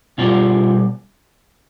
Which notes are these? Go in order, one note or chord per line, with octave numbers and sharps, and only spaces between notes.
B2 G3 F4